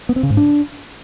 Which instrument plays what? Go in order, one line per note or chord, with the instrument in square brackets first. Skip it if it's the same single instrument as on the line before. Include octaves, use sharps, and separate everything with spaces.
[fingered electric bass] B3
C4
C#3
G#2
D4